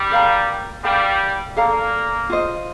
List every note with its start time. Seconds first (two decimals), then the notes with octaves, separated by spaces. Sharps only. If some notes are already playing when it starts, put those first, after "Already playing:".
Already playing: G3
0.11 A#4 F5 A#5
0.84 G3 A#4 F5 A5
1.56 A#3 A4 D5 F5 A#5
2.30 F4 C5 D#5